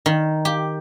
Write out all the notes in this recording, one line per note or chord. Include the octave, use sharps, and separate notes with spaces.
D#3
G4